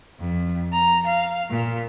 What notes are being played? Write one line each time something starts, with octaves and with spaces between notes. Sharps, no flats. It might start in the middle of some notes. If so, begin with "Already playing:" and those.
F2
A#5
F5
A#2